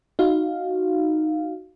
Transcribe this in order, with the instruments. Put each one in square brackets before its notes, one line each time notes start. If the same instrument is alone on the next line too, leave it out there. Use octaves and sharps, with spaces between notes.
[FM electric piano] D#4 F#4 F5